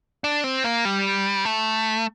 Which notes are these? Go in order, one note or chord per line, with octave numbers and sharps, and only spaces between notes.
D4
C4
A#3
G3
A3